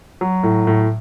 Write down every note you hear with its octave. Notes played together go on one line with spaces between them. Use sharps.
F#3
A2
A2